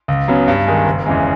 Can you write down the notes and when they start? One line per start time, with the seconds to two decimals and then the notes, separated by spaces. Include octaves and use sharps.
0.08 C#2
0.28 C#3 F#3 B3
0.48 G2
0.67 D#3 G#3
0.86 F#1
1.06 E2 C#3 E3 G#3